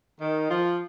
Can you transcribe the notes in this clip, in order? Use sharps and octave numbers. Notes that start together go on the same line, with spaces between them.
D#3
F3